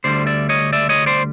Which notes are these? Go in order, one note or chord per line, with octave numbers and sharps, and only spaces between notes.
D2 D3 G3 C5 D5
D5 E5
C#5 D#5
D5 E5
C#5 D#5
C5 D5